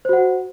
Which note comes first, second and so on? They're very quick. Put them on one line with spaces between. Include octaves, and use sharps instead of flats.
C5 F#4 F#5